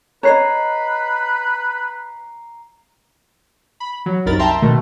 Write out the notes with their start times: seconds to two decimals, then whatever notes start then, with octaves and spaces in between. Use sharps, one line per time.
0.23 B4 C#5 D#5 A#5 C7
3.80 B5
4.06 F#3
4.26 C2 F#2 D#4 A#4 B5 A6
4.39 E5 G5 A5 A#5 C6
4.62 B2 D#3 A3